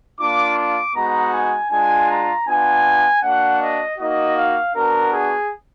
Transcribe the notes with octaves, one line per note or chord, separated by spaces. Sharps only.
A#3 D4 F4 D6
D6
G#3 B3 D#4 F#4 A#5
G#5
G#3 D4 F4 G#5
A#5
B3 D4 F4 G#5
A#3 D4 F#4 F#5
D#5
A#3 D#4 F#4 D#5
F5
B3 D4 F#4 A#4
G#4